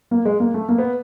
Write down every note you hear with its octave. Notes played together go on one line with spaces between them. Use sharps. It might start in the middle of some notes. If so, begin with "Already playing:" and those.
A#3
G#3
A#3
A3
A#3
B3